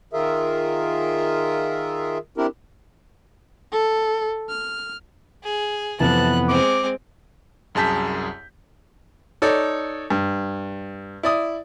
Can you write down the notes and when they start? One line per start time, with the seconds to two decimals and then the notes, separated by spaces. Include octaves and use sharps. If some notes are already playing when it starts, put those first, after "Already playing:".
0.13 D#3 F4 G#4 A#4 E5
2.37 C4 D4 E4 G4 A#4
3.72 A4
4.49 F6
5.43 G#4
6.00 F2 C3 E3 B3 A5 F#6
6.49 G#3 C4 D6
7.75 C2 F#2 G#4 A5 G6 B6
9.42 D#4 A4 C#5 D5
10.10 G2
11.23 E4 D5 D#6